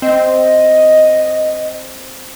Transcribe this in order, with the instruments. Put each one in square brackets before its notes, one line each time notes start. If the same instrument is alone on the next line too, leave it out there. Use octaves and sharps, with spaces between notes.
[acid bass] C4 [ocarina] D#5